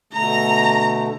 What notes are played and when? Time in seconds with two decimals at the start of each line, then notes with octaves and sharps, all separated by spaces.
0.13 B2 D3 A3 A#5